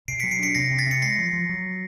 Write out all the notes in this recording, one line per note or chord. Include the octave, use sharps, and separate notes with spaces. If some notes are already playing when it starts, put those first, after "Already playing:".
B2 C7 D7
F#3 B6 C#7
C7 D7
D4 B6 C#7
C3 A#6 C7
C3
A6 B6
C3 C#7
G#3 A#6 C7
F3
F3
F#3